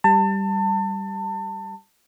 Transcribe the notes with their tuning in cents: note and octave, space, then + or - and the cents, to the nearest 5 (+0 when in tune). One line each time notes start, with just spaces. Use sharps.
G3 +0 A5 +30